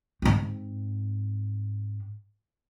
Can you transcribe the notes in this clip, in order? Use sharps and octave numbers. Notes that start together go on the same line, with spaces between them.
G#2 C4